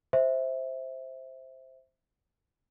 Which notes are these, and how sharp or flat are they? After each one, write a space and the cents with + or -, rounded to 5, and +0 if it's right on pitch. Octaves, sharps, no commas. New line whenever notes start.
C5 +0 E5 -10